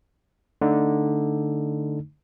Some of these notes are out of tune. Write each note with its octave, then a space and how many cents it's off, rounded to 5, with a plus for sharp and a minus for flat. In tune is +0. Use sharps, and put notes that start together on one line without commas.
D3 +0 A3 +0 D#4 +0